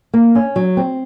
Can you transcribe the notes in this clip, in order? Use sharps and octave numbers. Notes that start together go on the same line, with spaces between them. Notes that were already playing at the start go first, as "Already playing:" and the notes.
A#3
C#4
F#3
C4